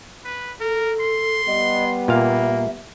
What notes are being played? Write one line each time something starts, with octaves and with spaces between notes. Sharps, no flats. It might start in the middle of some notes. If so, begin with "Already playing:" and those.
B4
A4 A#4
C6
G3 B3 D#5
A#2 A#3 E5 F5